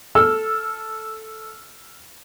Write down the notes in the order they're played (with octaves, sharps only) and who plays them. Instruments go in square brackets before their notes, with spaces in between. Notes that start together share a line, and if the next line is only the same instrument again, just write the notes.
[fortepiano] A4 [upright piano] E6 F6